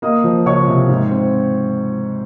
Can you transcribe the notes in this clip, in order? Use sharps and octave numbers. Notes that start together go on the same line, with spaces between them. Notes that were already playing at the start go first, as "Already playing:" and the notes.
A#3 D#5 D#6
F3
C#2 C#5 C#6
C3
G#2
C4